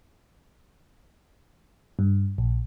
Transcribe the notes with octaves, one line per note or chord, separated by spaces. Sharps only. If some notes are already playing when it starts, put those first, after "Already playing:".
G2
A#1